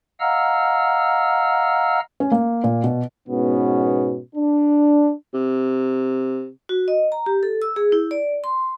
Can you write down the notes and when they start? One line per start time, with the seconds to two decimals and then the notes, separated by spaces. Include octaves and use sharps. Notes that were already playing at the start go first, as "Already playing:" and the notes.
0.20 D#5 F5 F#5 A#5 E6 F6
2.20 C#4
2.31 A#3
2.64 A#2
2.84 B2
3.28 G#2 B2 B3 C#4
4.36 D4
5.34 C3
6.69 F#4
6.88 D#5
7.12 A#5
7.26 G4
7.43 A4
7.62 E6
7.76 G#4
7.92 E4
8.11 D5
8.44 C6